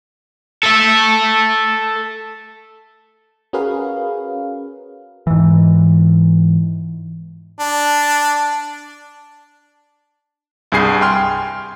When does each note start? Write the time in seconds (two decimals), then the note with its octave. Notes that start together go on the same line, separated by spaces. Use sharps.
0.63 A4 E5
3.53 C#4 F#4 G#4 A#4 B4 F5
5.27 G#2 E3
7.60 D4
10.72 C2 G2 G#4 G#5 C7
11.01 G5 G#5 C6 F6